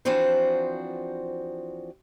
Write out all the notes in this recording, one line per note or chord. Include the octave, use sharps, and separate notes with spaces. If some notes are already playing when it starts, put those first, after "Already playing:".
E3 F3 C4 D4 F#4 C5